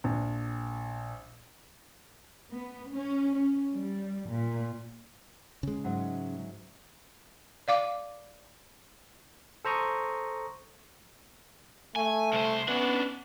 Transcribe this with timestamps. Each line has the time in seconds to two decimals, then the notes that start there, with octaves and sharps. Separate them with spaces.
0.04 A#1
2.52 B3
2.91 C#4
3.34 C#4
3.74 G3
4.31 A#2
5.63 C#3 G#3
5.84 G#2 F#3 E5
7.68 D5 F5 D6
9.65 A4 C5 A#5 C#6 D#6
11.96 A3 G#5
12.33 C2 C5
12.68 B3 C#4 D4